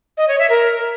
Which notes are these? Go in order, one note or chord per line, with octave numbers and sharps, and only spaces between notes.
D#5
C#5
E5
A#4